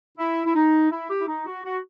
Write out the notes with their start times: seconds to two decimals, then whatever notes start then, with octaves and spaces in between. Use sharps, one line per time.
0.18 E4
0.46 E4
0.55 D#4
0.91 E4
1.10 G4
1.20 E4
1.28 D#4
1.46 F#4
1.65 F#4